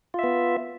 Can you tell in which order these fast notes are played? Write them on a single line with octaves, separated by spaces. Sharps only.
F4 E5 B3